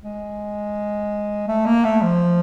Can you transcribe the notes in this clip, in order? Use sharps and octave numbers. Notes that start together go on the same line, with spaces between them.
G#3
A3
A#3
A3
F3